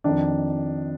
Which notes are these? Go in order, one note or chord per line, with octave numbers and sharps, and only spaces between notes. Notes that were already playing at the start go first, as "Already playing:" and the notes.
F2 D#3 D4